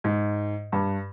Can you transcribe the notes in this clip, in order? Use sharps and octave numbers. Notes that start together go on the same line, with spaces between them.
G#2
G2